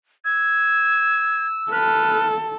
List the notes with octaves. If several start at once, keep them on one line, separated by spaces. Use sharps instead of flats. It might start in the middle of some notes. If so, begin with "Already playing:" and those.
E6 G#6
A4 B4 F6